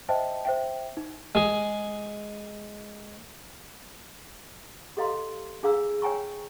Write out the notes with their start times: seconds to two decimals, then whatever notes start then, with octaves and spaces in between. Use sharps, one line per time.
0.09 C5 D#5 E5 G5 A5
0.45 C5 E5 G5
0.97 D#4
1.35 G#3 G#4
4.97 G4 A4 D#5 F5 A#5 C6
5.63 D4 G#4 F5 A#5 E6
6.02 C#5 G5 G#5 A#5 C#6